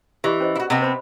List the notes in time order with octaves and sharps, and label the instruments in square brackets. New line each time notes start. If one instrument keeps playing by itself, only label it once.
[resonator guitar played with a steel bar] E3 [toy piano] G4 D5 D#5
[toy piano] C#4 C5 D#5
[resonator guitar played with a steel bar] E4 F#4
[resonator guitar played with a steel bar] C3 B3 C4 [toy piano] D#5
[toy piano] C5 B5